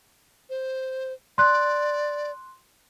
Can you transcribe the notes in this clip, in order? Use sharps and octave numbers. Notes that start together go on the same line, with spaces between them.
C5
D5 C6 F#6